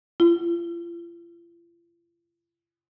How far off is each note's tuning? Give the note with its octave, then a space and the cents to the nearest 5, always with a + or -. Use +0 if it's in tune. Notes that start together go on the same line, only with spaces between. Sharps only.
F4 -40